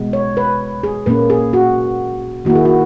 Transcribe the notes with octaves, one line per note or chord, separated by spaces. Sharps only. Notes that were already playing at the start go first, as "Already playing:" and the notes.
Already playing: B2 G#3 B3
C#5
B4
G#4
A#2 A#3 C#4 B4
G#4
F#4
D#3 A#3 E4 F#4
G#4
F#4